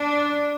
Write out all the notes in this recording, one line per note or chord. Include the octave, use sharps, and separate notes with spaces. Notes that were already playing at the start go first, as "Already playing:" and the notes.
Already playing: D4